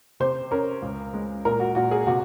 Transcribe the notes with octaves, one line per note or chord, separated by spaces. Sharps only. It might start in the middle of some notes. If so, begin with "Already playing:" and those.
C3 C5
C#4 A#4
C#2
G#3
A#2 A#4
F#4
A#2 F#4
G#4
C3 F#4